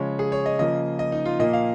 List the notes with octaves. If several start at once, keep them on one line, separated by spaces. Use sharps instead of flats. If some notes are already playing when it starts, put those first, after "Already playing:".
Already playing: C#3 F3 G#3 C#5
G#4
C#5
D#5
C#3 F3 A#3 D#5
D#5
D#4
F4
A#2 F3 A#3 D#5
F5